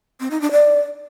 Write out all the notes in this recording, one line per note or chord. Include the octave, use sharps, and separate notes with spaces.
C4
D#4
D4
D5